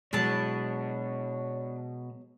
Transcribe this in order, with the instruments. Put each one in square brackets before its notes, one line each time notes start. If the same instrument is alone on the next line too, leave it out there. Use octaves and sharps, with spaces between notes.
[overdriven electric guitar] B2 [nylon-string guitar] F#3 G#3 [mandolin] D4 E4 A5 [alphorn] C#5